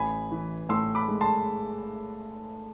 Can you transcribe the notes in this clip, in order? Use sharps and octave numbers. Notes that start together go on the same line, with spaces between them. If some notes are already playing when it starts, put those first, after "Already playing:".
Already playing: A1 G#5 B5
E3
A2 C6 E6
B5 D6
G#3
A5 C6